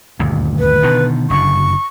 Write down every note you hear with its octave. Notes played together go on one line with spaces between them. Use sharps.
D#1 D2 G2
B4
B2 D3 D#3
F#1 F#2 D3 C#6